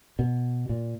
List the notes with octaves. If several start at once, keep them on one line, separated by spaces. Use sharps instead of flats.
B2
A#2